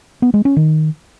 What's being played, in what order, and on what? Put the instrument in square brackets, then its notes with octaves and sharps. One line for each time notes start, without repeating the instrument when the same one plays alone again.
[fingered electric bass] B3
G#3
C#4
D#3